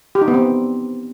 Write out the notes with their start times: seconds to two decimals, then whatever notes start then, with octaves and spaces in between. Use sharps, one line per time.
0.15 G4
0.21 D#4
0.28 B3
0.34 C4